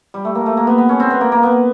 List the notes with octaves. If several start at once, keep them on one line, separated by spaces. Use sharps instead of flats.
G3
A3
A#3
A3
A#3
B3
B3
C#4
C4
B3
A#3
A#3
B3